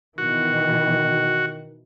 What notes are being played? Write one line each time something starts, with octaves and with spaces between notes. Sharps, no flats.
B2 D#3 E3 F#4